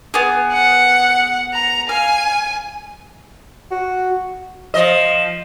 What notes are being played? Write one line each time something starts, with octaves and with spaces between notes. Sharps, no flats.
B3 G#4
F#5
A#5
F5 G#5
F#4
F3 D#5